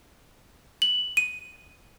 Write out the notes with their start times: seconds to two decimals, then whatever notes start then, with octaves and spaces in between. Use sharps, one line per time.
0.82 F#7
1.17 D#7